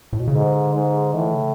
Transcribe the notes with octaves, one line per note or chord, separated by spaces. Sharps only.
A2
B2
C#3
G#2 D3
G#2
A2 E3
C#3